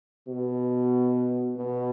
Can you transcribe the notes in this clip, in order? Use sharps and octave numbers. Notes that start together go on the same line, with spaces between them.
B2
B2